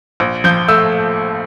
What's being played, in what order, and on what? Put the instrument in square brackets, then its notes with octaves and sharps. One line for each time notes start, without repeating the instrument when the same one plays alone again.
[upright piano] A#1
F3 G6
A3 E6